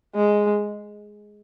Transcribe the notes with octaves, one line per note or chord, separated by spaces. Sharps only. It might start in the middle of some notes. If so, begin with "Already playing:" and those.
G#3